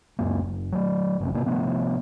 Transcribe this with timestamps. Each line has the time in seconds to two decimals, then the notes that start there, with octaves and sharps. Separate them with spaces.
0.19 C#2 F#2 A#3
0.40 F#1
0.72 F#3 A3
1.20 G1 C2 F#2 C3
1.34 C3 A#3
1.46 C3 F3 A3 B3